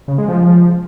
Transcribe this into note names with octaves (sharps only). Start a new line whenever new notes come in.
C#3
G#3
F3